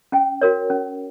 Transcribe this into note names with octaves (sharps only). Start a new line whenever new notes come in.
C#4 G5
F#4 A#4 C#5
C#4